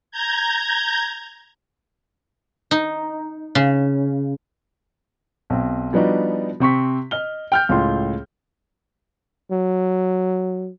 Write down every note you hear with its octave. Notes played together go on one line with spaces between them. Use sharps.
A#5 G6 G#6
D#4
C#3
B1 C4
F3 G3 B3 D4 D#4 F#4
C3 C4 C#6 B6
D#5 F6 G7
G5 F6 G6
C#2 A2 F4 C6
F#3